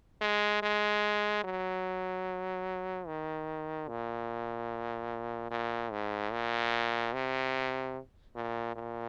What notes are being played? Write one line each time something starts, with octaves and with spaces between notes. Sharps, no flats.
G#3
G#3
F#3
D#3
A#2
A#2
G#2
A#2
C3
A#2
A#2